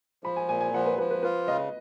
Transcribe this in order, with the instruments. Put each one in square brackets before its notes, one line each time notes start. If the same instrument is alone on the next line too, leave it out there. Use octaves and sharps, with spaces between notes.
[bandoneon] F3 [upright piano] B5
[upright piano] G#5
[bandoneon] A#2 [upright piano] G#5
[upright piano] G#5
[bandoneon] F3 [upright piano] F#5
[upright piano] B4
[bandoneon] F3 [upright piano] B4
[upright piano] B4
[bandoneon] F4 [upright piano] B4
[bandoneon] C#3 [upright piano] D#5